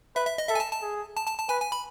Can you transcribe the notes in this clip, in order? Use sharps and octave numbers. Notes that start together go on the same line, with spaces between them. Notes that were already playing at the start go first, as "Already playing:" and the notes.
B4 E5
E5
D#5
A4 E5
G#5
A5
A5
G#4
A5
A5
A5
B4 G#5
G#5
B5